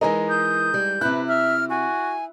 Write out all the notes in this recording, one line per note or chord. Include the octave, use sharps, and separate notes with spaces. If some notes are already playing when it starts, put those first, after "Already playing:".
E3 G#3 D#4 A#4
D#6 G6
G3
C3 E4 B4 F#6
E5 F6
F#4 G#5